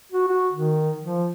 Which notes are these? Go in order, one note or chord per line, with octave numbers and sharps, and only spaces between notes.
F#4
F#4
D#3
F3